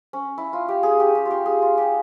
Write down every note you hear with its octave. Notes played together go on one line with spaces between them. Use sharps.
C#4
E4
F4
G4
G#4
G4
G4
F4 G4
G#4
F4
G4